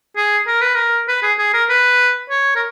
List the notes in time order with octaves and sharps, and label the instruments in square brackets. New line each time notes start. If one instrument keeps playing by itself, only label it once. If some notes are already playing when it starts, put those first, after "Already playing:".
[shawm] G#4
A#4
B4
A#4
B4
G#4
G#4
A#4
B4
C#5
A#4